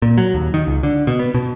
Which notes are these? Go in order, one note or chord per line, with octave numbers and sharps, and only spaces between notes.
A#2
F#3
D#2
D#3
C#2
D3
B2
B3
B2